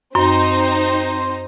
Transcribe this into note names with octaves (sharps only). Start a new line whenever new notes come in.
F#2 C4 D#4 C5 C6